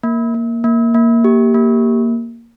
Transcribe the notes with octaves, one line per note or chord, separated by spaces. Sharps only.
A#3
A#3
A#3
A#3
G4
A#3